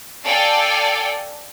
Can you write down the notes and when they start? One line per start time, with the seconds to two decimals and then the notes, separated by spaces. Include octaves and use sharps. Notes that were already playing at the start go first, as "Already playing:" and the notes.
0.24 A4 D5 F5 G5 G#5